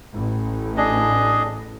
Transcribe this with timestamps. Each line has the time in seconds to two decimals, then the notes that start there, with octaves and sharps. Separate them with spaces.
0.14 A1
0.77 D4 G#4 D#5